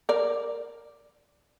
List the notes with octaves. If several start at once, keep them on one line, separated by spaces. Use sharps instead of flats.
A#4 D5